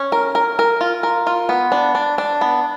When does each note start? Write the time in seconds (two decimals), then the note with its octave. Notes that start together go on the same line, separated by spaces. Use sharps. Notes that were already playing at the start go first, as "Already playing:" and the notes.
Already playing: C#4
0.12 A#4
0.35 A#4
0.59 A#4
0.81 F4
1.03 A#4
1.27 F4
1.49 B3
1.72 D4
1.95 D4
2.18 D4
2.41 B3